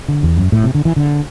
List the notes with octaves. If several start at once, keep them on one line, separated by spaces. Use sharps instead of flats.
D3
E2
F#2
A2
C3
D3
E3
D3